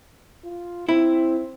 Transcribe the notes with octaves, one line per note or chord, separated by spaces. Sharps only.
F4
C4 E4